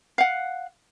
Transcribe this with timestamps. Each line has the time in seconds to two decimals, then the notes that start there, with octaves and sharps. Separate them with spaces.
0.18 F5 F#5